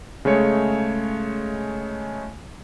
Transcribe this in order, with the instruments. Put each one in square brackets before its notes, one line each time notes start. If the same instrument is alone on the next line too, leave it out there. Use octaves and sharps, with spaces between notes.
[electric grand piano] C#3 G#3 A3 C#5 C#7